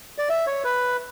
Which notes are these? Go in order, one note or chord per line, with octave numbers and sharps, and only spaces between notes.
D5
E5
C#5
B4